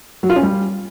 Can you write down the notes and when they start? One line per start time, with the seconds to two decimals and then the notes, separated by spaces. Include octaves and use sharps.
0.23 F#3
0.30 F4
0.36 C#4
0.43 G3